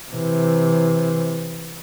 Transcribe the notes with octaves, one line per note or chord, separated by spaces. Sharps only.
C3 E3